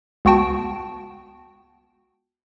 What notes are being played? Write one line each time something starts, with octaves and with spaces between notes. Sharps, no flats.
C#2 B3 F#4 G5 A5